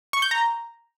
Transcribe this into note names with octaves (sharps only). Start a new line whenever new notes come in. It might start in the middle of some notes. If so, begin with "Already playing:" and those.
C#6
G6
A#5